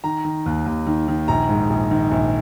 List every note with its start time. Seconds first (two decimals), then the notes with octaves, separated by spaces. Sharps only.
0.04 D#3 A#5
0.25 D#3
0.46 D#2
0.66 D#2
0.86 D#3
1.08 D#3
1.28 A#1 A#5
1.49 G#2
1.70 A#1
1.91 D#3
2.12 A#1